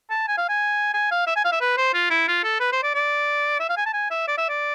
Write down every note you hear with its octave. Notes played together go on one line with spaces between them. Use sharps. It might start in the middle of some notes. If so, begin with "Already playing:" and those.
A5
G#5
F5
G#5
G#5
F5
E5
G#5
F5
E5
B4
C5
F4
E4
F4
A4
B4
C5
D5
D5
E5
F5
G#5
A5
G#5
E5
D5
E5
D5